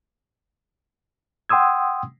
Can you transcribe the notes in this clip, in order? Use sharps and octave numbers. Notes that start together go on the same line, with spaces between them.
F#5 G5 C6 D#6 E6 G#6